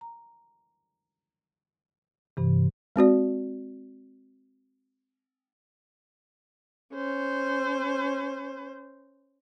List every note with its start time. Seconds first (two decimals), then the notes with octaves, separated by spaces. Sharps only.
0.01 A#5
2.37 G2 C3 E3
2.96 G#3 C4 F#4 D5
6.94 C#4 C5